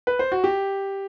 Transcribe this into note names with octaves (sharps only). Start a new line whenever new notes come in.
B4
C5
F#4
G4